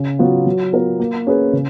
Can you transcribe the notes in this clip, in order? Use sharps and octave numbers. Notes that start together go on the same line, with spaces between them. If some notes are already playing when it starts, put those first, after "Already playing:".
Already playing: C#3
F#3 B3 F4
F#3
B3 F4 A#4
A#3
C#4 G#4 B4
C#3